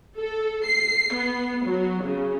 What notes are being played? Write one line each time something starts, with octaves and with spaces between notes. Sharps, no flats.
A4
C7
B3
F#3
C#3